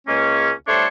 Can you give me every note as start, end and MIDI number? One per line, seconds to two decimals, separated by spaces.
0.07 0.51 37
0.07 0.51 56
0.07 0.51 58
0.07 0.51 61
0.67 0.86 55
0.67 0.86 57
0.67 0.86 62
0.67 0.86 69
0.67 0.86 72
0.67 0.86 73